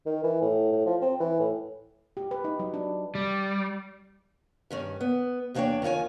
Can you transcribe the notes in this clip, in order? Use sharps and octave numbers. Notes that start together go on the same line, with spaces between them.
D#3
E3
A2
A2
F3
C4
E3
A2
G4
B4
D#4
F#3
D4
G3
G2 D#3 C#4
B3
E2 A#3 D4 C5 C#5 G5
F#2 D#3 F4 C#5 G#5